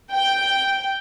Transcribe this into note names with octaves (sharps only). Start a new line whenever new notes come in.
G5